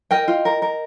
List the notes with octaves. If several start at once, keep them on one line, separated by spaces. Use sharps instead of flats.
A#4 D#5 G5
F4
A#4
A#4